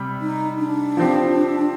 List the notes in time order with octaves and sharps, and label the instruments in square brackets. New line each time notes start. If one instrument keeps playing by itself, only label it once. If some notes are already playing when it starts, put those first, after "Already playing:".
Already playing: [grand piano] C3 G3
[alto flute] D#4
D4
[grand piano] F3 C4 G4